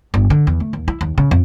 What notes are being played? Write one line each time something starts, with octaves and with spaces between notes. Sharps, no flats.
G1
D3
E2
A3
D#2
E4
D#2
C#3
F2